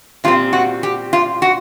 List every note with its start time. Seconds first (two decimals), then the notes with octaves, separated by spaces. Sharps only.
0.24 A#2 G3 C4 F4
0.53 F#4
0.83 G4
1.13 F4
1.42 F#4